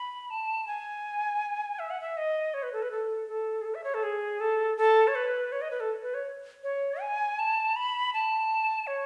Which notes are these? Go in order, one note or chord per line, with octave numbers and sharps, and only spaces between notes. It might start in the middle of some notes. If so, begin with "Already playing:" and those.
Already playing: B5
A5
G#5
E5
F#5
E5
D#5
C#5
B4
A4
B4
A4
A4
G#4
A4
E5
C#5
A4
G#4
A4
A4
C#5
B4
C#5
D#5
B4
A4
B4
C#5
C#5
G#5
A5
B5
A5
C#5